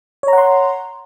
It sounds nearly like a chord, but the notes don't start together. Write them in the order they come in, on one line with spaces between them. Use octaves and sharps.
C#5 A#5 F#5 C6